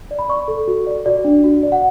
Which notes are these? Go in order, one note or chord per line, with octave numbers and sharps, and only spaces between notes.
D5
B5
D5 C#6
A4
F#4
D5
F#4 D5
D4
F#4
D5
F#5